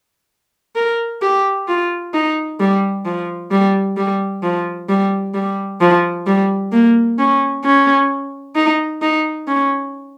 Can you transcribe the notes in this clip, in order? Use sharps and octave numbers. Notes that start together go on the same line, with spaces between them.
A#4
G4
F4
D#4
G3
F3
G3
G3
F3
G3
G3
F3
G3
A#3
C#4
C#4
D#4
D#4
C#4